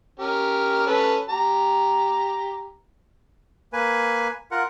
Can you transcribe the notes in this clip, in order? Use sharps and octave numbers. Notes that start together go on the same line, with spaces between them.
C#4 G4 A#4
C#4 A4 B4
G4 A#5
A#3 B4 G#5
F4 A#4 F#5